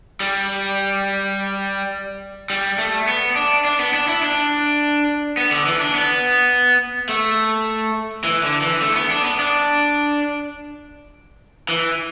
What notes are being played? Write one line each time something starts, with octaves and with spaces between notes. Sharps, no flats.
G3
G3
A3
B3
D4
D4
B3
D4
E4
D4
B3
D3
E3
D4
B3
A3
E3
D3
E3
A3
B3
D4
B3
D4
E3